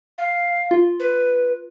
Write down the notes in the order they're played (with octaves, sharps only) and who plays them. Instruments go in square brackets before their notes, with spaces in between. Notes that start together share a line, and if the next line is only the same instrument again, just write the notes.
[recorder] F5
[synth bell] F4
[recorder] B4